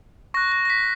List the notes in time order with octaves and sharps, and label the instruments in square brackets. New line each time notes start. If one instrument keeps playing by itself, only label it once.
[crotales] C#6 F#6 A#6
A#6
A#6
B6